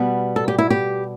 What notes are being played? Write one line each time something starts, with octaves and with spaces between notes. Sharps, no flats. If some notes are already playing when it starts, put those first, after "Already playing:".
Already playing: B2 G3 B3
A4
G4
E4
G4